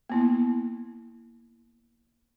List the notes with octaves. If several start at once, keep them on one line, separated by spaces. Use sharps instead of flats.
A#3 B3 E4